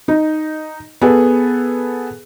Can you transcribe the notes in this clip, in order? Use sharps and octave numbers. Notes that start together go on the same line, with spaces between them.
D#4
B3 G#4 A4